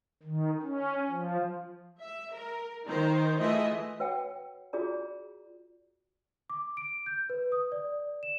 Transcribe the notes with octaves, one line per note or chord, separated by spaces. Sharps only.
D#3
C#4
F3
E5
A#4
D#3 D#4 C5
E3 A3 F4 G#4 D#5 E5
F#4 B4 C#5 F#5 G5
F4 F#4 G#4 D5 A#5
D6
D7
G6
B4
D#6
D5
E7